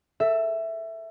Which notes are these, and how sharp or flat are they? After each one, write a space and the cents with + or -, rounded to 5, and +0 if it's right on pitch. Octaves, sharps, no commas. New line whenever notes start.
A4 +30 E5 +0